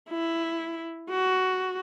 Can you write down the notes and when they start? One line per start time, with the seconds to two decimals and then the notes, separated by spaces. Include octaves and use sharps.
0.10 E4
1.10 F#4